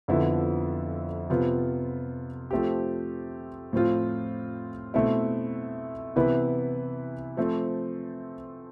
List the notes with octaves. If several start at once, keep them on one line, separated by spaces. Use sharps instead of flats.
F2 D3 F3 B3 E4
C3 F3 B3 F4
F3 A3 C4 G4
A2 F3 C4 F4
B2 A3 C4 E4
C3 E3 B3 E4 B4
F3 A3 C4